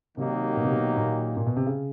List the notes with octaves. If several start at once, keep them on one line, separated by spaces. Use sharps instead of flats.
C3 D#3 F#3 A#3 D#4 G4
B2
C3
B2
A#2
A#2
B2
C3
C#3